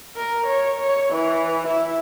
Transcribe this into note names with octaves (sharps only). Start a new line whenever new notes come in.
A#4
C#5
C#5
E3
E4